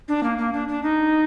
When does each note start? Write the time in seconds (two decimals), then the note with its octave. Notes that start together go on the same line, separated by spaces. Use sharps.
0.08 D4
0.23 A#3
0.38 A#3
0.53 D4
0.68 D4
0.83 D#4